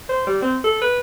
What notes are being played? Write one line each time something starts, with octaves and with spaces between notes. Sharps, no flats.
C5
G3
C4
A4
B4